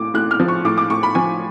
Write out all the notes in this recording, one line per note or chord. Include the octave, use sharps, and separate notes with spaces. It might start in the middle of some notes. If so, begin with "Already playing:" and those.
Already playing: A2 D6
A2 F#6
F6
F3
C#6
A2 D6
D6
A2 C#6
B5
F3 G#5